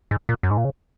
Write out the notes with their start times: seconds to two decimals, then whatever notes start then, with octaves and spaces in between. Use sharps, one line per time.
0.11 G#2
0.29 A#2
0.43 F#2
0.51 G#2
0.57 A#2
0.65 C#3